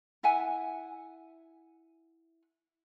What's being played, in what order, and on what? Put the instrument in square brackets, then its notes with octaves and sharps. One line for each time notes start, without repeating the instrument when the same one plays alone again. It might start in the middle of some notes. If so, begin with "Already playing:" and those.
[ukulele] E4 E5 F#5 G#5